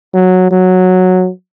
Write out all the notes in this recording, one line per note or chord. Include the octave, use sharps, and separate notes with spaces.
F#3
F#3